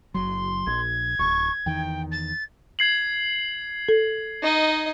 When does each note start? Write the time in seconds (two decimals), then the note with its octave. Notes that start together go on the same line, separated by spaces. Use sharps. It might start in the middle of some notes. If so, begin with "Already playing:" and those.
0.14 F#1 F#3 C6
0.67 A#1 G#6
1.19 D1 C#6
1.66 E2 D#3 G5
2.12 A6
2.79 G#6 C7 F#7
3.89 A4
4.42 D#4 D#5